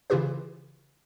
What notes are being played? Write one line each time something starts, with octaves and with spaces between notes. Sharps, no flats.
C#3 E3 E4 F4 G4 B4